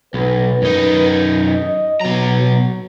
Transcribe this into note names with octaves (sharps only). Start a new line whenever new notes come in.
B1 B4
F#2 D#4
D#5
B2 F#3 A#5
F#3